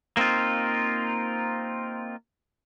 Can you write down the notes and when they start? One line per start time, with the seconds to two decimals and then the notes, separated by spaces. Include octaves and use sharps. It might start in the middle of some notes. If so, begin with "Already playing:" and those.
0.17 A#3 C4 D#4 F4